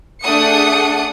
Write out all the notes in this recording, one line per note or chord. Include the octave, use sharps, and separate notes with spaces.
A3 D4 G#4 F#5 D#6 C#7